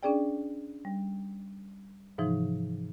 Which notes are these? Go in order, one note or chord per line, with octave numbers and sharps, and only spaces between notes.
C#4 D4 G#4 D5 G5
G3
G#2 C3 E3 F3 D#4